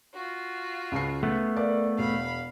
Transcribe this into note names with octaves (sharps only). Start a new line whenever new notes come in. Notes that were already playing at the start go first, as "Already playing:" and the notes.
F4 F#4
C#2 C7
A3 B3
A#4 D5 F5
E1 F5 B5